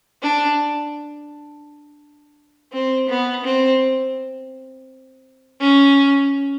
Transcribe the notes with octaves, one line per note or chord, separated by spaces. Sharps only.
D4
C4
B3
C4
C#4